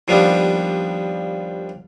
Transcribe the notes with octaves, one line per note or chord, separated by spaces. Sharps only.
D#2 F3 G3 B3 D4